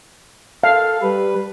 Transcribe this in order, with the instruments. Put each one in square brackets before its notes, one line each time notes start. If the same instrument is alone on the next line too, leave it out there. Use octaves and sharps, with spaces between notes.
[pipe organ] A4 [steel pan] F5
[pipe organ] G3 B4